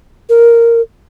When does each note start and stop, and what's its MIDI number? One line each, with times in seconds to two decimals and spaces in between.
0.29 0.81 70